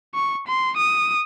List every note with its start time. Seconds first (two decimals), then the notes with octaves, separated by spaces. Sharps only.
0.15 C#6
0.47 C6
0.77 D#6